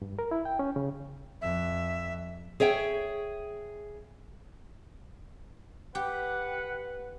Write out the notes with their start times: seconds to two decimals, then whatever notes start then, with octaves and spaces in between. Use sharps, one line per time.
0.02 G2
0.19 A#4
0.31 E4
0.45 G5
0.59 C#4
0.76 C#3
1.41 F2 E5
2.60 G#4 C#5 E5 G5
5.95 G4 B4 F#5